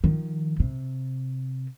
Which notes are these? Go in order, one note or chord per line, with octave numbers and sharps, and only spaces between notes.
D#3 F3
C3